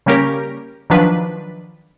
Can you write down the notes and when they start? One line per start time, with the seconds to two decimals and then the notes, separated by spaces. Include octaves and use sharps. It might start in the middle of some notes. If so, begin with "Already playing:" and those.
0.06 C#3 G3 A#3 C#4 G4 A#4
0.90 D#3 F3 F#3 D4 B4